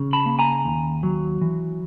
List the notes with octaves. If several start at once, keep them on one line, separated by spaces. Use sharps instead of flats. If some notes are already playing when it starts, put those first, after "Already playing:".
Already playing: C#3
A5 B5
A#3
G#5 A#5
D#2
F#3
E3